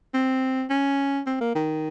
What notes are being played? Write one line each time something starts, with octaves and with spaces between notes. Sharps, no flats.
C4
C#4
C4
A#3
D#3